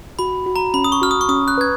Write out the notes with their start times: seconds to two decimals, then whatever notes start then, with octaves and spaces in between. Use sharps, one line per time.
0.19 F#4 B5
0.46 F#4
0.56 A#5
0.74 C#4 B5
0.84 D#6
0.92 C#6
1.02 F#4 F6
1.11 D#6
1.21 C#6
1.29 C#4 D#6
1.48 F#6
1.58 B4 G#6